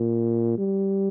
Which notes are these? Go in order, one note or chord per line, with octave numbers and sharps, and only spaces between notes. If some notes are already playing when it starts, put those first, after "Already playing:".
Already playing: A#2
G3